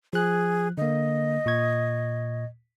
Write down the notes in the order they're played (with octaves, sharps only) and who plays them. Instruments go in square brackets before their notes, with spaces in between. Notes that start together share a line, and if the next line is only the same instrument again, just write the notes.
[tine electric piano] F3 F#6 [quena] G#4
[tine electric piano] D3 A#3 [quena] D#5
[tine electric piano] A#2 C#6 G#6